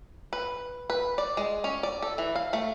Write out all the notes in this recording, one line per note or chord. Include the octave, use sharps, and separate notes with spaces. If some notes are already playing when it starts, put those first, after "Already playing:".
B4
B4
D5
G#3
C#4
D5
A4
E3
F5
A3